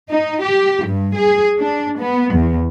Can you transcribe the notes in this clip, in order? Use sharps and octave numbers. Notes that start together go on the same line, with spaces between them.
D#4
G4
G2
G#4
D4
B3
E2